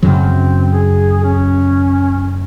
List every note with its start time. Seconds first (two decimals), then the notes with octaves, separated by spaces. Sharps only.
0.02 F#2 C#3 F#3 C4
0.72 G#4
1.24 C#4